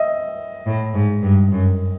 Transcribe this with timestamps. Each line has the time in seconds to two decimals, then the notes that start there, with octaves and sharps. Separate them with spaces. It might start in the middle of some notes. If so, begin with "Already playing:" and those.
Already playing: D#5 E5
0.67 A2
0.94 G#2
1.23 G2
1.52 F#2